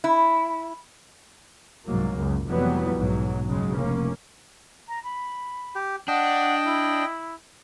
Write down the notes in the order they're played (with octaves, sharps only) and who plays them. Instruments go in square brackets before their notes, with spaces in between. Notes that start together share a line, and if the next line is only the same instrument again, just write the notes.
[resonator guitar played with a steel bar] E4
[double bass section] C2 G#2 F#3 A#3
C#2 F#2
F1 F2 E3 F#3 G3 B3
B1 G#2 F#3
F#1 C#3 F#3 G#3
F1 A#3 C#4
[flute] A#5
B5
[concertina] G4
[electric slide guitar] D4 [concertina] D#5 G5 [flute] F#5
[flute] E4